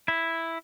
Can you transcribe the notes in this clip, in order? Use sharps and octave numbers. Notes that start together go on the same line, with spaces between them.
E4